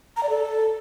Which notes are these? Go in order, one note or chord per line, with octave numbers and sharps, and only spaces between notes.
A#5
D5
A4